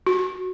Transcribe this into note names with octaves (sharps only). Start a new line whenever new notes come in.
F#4